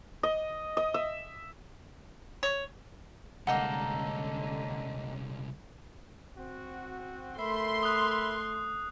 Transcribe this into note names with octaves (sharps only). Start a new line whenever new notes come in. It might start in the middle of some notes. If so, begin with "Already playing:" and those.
D#5
D#5
E5
C#5
C2 D3 G#3 A#3 C#4 D#4 A4 F#5
C4 F#4
A3 A#4 E5 B5 C6 C7
D#6 F#6